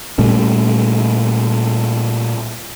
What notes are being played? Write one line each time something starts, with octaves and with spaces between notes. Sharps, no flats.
A#2 G3 A3 C#4